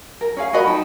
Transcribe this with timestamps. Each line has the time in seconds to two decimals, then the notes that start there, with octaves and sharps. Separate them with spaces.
0.21 A#4
0.36 C#4 G#4 F5
0.53 F#4 A#4 D#5 B5
0.67 D#4 G5 A5 B5